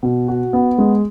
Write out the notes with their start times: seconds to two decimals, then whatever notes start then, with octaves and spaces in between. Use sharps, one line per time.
0.03 B2
0.28 F#4
0.53 B3
0.78 G#3